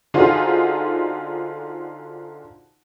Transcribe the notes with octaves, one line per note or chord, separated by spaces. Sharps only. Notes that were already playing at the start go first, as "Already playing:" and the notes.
D3 D#4 F4 F#4 G#4 C5